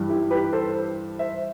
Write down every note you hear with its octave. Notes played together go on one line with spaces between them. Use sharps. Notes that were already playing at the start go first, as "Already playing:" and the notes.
Already playing: G2 E3 G3
E4 G4
G4 B4
A4 C5
C5 E5